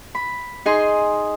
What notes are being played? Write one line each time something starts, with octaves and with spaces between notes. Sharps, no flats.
B5
D#4 G#4 D#5 C6